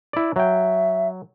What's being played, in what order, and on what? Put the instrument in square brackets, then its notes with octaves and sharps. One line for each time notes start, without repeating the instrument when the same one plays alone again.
[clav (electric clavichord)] E4 D5
[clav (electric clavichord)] F#3 G5 [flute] E5